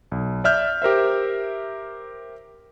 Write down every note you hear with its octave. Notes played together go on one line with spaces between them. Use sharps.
B1
D5 E5 F6 G6
G4 A#4 C5 E5